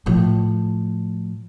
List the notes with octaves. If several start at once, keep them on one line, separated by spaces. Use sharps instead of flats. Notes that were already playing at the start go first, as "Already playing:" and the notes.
A2 F3